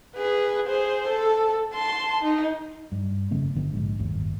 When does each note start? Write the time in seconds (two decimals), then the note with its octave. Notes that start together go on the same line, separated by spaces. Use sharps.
0.16 G#4 B4
0.67 G#4 C5
1.08 A4
1.74 A5 C6
2.23 D#4
2.92 G2
3.31 F1 C#3 A3 B3
3.55 G1 D3 B3
3.73 A#1 G#2
3.99 G1 D#2 A2